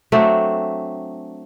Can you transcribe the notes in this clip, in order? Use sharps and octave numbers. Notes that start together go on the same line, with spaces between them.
F#3 A3 C4 D4